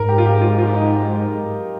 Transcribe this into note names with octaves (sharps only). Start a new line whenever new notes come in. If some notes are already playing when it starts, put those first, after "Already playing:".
Already playing: G#2 A#4
G4
F4
G4
F4
F4
D#4